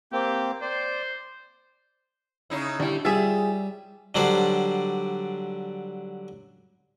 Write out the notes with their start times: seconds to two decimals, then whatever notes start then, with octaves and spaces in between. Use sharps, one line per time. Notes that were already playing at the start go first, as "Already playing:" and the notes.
0.12 A#3 C4 G4
0.61 C5 D5
2.50 C#3 D#4 E4
2.80 D3 G3 E4
3.05 G3 F4 G#4 E5
4.15 D3 F#3 G3 D4 C5